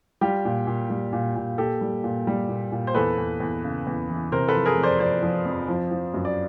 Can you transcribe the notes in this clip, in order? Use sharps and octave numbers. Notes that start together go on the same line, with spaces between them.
G3 F4 G4
A#2
A#2
G3
A#2
A#2
A#2 G4 A4
G3
A#2
G3
A#2
A#2
C5
E2 A4 B4
E2
E2
C#3
E2
E3
C3 A#4 C5
A4 B4
F3
G#4 A#4
F2
C5 D5
F2 C5 D5
F3
F2
F3
F3
F#2
D5